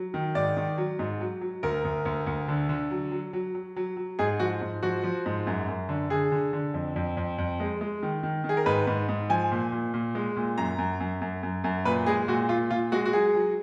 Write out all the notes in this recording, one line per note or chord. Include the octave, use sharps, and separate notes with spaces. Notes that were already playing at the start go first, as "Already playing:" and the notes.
Already playing: F#3
D#3
G#2 D5
D#3
F#3
G#2
F#3
F#3
D2 A#4
D2
D2
D2
D3
D3
F#3
F#3
F#3
F#3
F#3
F#3
G#2 G#4
F3 F#4
G#2
F3 F#4
F3
G#2
F#2
F#2
D3
D3 G#4
D3
D3
F2
F2
F2
F2
G#3
G#3
D#3
D#3
D#3
G#4
A#4
G#2 B4
G#2
G#2
F3 G#5
A#2
A#2
A#2
G#3
A#2
F#2 A#5
F#2
F#2
F#2
F#2
F#2
A#2 B4
G#3 G#4
A#2 F#4
A#2 F4
A#2 F4
G#3 F#4
F#4
F#3 G#4
F#3